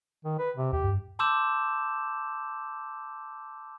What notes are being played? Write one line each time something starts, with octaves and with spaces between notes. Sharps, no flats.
D#3
B4
C3
D#2 G4
G2
A5 C6 D6 E6 G6 E7